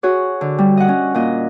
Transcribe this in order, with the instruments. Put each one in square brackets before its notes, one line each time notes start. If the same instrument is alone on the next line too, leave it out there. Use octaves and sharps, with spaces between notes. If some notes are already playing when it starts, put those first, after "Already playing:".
[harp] F#4 G#4 C#5
D3
G3
D#5 F#5
C#4
A#2 D#5